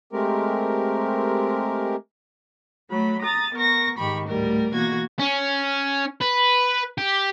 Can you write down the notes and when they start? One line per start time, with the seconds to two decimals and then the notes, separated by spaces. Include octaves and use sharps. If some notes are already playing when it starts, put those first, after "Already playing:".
0.13 G#3 A3 C4 G4 A#4
2.90 F#3 A3 B5
3.21 A#5 D#6 A6
3.54 B3 A#4 C#6 A#6
3.97 G#2 D#3 G4 B5 C#6
4.26 D2 A2 G3 A3 A#4
4.73 B2 E3 A#3 F#4 G#6 A#6
5.20 C#4
6.21 B4
6.98 G4